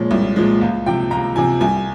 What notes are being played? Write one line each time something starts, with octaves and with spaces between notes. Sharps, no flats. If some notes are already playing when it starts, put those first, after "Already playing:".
Already playing: A#2 F3 G#3 C#5
C2
A#2 F3 G#3
C#2
C3 F3 G5
C#2 A#5
C3 F3 G#5
C2 G#5